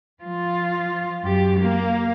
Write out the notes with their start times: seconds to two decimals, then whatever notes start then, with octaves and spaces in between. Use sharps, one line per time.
0.23 F3 F4
1.22 F#2 G4
1.60 A#3